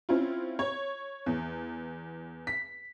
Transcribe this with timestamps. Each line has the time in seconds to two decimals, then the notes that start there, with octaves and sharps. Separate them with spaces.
0.09 C4 C#4 E4 F4
0.59 C#5
1.26 E2
2.47 B6